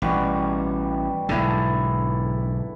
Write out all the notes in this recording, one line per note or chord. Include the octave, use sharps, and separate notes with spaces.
A1 B2 G3 F#4
B1 G#2 D3 E4 A4